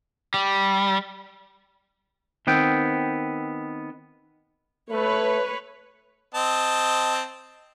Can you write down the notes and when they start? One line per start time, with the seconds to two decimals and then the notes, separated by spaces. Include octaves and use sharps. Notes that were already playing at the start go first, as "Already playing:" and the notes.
0.34 G3
2.47 D#3 B3 C4 G5
4.89 A3 B4 C#5
6.35 C4 D#5 A5